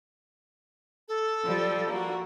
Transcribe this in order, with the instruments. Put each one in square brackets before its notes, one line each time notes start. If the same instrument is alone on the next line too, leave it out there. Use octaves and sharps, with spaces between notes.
[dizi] A4
[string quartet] F3 G3
A#3 F#4